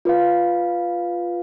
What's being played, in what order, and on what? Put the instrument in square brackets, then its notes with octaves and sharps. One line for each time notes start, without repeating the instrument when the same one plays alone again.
[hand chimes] F4 B4 F5